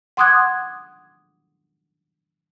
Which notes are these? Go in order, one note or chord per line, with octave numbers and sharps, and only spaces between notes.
F#5 C6 D6 D#6 F#6 G#6